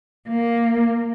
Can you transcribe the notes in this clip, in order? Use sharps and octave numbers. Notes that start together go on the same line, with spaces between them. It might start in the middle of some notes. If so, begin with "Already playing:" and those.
A#3